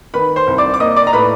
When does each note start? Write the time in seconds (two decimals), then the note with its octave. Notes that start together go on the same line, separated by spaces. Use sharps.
0.14 D#3 B4 B5
0.36 C5 C6
0.47 C2
0.58 D5 D6
0.74 D6
0.80 A#3 D#5 D#6
0.96 D5 D6
1.07 A#5
1.13 A2 B4 B5